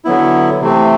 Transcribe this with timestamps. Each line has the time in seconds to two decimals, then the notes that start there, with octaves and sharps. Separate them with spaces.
0.05 D3 F#3 B3 E4
0.61 C3 E3 A3 C4